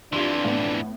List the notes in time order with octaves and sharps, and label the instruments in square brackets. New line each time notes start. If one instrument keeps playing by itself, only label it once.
[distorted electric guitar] F2 E3 [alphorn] D4 [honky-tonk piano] F4 G4 C6
[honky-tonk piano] A2 B3